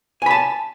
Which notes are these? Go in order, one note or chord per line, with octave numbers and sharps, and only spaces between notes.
G#5 A5 B5